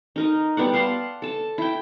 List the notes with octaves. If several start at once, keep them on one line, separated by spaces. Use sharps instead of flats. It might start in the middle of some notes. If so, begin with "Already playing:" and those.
D#4 A#4 D#5
G3 B3 D5 F#5
F5 F#5 A5 C6
A4 A5
E4 G5